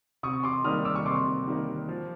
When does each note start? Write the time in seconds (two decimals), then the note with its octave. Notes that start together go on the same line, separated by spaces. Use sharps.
0.23 C3 C#6 D#6
0.43 C6 D6
0.64 D#3 G3 A#3 D#6 F6
0.85 D6 E6
0.96 C#6
1.05 C3 C6 D6
1.47 D#3 G3 A#3
1.89 F3